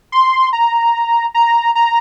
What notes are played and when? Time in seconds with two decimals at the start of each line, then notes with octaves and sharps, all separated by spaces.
0.12 C6
0.53 A#5
1.34 A#5
1.75 A#5